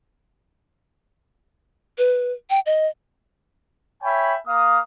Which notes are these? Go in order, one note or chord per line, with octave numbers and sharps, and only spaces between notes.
B4
G5
D#5
C#5 E5 G5 G#5 B5
A#3 F5 D#6